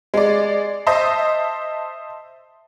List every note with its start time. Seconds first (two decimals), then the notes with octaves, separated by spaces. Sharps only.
0.14 G#3 D5
0.87 C5 D#5 E5 A5